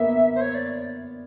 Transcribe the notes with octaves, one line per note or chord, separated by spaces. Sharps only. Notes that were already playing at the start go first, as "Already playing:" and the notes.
Already playing: A#3 B3 E5
C5
C#5
D5